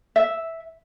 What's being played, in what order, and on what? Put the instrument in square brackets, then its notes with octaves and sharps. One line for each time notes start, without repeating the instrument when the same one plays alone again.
[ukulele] E5